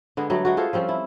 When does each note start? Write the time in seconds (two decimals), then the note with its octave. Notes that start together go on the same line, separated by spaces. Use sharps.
0.17 D3 G#3 B3
0.30 F#3 G3 A3 B3
0.45 G#3 A3 B3 F#4
0.57 F4 G#4 A4 C5
0.73 F3 G3 C4 C#4
0.89 E4